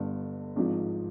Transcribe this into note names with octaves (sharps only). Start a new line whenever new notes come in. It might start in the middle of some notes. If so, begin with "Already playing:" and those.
Already playing: G1 G2 D3
G#1 G#2 F3